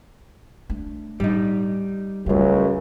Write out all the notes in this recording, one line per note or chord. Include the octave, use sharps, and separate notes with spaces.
A3 D4
A2 G3 D#4
C#2 F#2 G3 A3